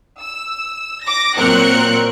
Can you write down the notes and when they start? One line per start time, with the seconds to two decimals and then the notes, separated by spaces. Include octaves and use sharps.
0.20 E6
1.04 D6 A#6
1.37 A#2 F#3 C4 A#4 F#6 C#7